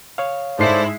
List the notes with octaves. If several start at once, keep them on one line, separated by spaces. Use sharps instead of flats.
C#5 F5
G#2 G#3 E4 A4 C5 D5 C7